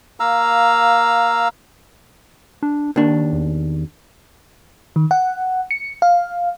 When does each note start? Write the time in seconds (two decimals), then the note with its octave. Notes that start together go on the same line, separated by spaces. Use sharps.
0.20 A#3 F5 A#5 E6
2.63 D4
2.96 D#2 D#3 D4
3.33 E2
4.96 D#3
5.11 F#5
5.71 C#7
6.02 F5